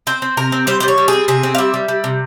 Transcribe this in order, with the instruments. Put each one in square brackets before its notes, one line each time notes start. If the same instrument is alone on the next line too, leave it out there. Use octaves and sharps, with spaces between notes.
[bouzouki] C4 C5
C4
C3 A#4
C4
G3 C5
G3 C5
C#5
G3
C4 G#4
C3 G#4
C4
F5
G3 E5
G3
G3
C3